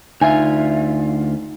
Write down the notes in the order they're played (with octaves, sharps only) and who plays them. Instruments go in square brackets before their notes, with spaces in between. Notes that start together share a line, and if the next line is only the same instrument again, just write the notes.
[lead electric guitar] D2 F4 [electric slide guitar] D#4 E5 [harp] G#5